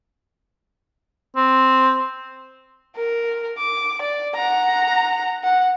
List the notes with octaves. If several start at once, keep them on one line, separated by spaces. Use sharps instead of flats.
C4
A#4
D6
D5
F#5 A#5
F#5